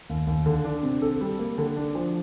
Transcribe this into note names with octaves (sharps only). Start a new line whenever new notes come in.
D#2
D#2
D3
D4
C3
A4
G3
A#3
D3
D4
F3